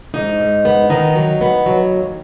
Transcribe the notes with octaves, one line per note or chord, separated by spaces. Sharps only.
G#2 D#4
G#2
B3
D#3 D#4
F#3
B3
F#3
D#2